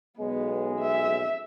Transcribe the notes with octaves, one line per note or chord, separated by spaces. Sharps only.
B1 G#3 B3
E5